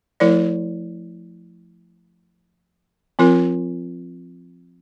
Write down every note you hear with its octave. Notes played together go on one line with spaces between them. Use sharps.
F3 A3 E4 A#4 D5
F3 C4 F4 A#4